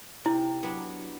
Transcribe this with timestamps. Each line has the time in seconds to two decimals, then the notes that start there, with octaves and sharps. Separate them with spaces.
0.25 C3 E4
0.63 F#3 B3 D4